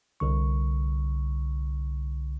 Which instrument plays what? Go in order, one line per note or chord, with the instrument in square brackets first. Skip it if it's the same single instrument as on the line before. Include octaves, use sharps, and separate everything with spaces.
[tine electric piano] C2 D3 C#6